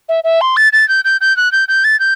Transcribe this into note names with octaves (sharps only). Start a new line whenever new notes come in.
E5
E5
C6
A6
A6
G6
G6
G6
F#6
G6
G6
A6
G6